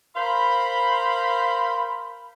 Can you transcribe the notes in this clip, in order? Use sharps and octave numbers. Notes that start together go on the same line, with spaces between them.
A#4 C5 F5 B5